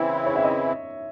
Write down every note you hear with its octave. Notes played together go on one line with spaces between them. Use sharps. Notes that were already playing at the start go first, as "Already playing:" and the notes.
Already playing: C#3 E3 C4 E4 E5
C#5
E5
D#5